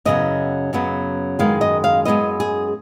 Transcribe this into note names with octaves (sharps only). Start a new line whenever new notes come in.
F#2 C#3 F#3 B3 D#5
F#2 C#3 F#3 B3
F#2 D#3 G#3 B3 F5
D#5
F5
F#2 D#3 G#3 B3 D#5
G#4